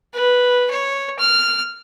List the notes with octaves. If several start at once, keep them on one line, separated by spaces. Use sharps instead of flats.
B4
C#5
F6